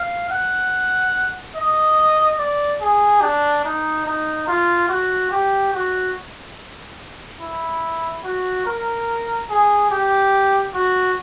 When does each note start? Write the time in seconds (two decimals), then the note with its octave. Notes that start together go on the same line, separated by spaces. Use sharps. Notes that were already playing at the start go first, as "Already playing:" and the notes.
Already playing: F5
0.30 F#5
1.55 D#5
2.38 D5
2.81 G#4
3.22 D4
3.65 D#4
4.06 D#4
4.48 F4
4.89 F#4
5.31 G4
5.74 F#4
7.41 E4
8.24 F#4
8.66 A#4
9.50 G#4
9.91 G4
10.74 F#4